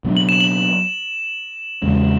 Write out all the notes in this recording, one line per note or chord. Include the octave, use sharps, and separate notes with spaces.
B2 F#3 B3 D4
F#7
E7
F#7
E2 C#3 G#3 C#4